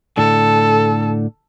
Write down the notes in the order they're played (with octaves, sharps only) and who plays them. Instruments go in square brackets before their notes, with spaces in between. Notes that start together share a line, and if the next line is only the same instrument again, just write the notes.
[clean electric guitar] A2 D3 [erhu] A4